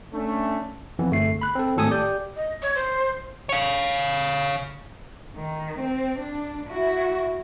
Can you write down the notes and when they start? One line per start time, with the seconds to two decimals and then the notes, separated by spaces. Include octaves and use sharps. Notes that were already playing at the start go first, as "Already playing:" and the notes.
0.13 A3 C#4 D4
0.99 F2 E3 B3
1.11 G1 A3 C7
1.42 B5 F#6
1.55 C4 A4
1.76 G#1 A2 A4 G#5 D#6
1.91 G4 D5 G6
2.36 D#5
2.62 C#5
2.75 C5
3.49 C#5 F5
5.36 D#3
5.80 C4
6.20 D4
6.70 E4 F#4